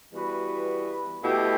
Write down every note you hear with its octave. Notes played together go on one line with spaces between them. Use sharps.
E3 G3 B3 F#4 B4
B2 A3 E4 G4